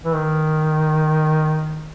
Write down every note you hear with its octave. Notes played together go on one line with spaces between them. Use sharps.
E3
D#3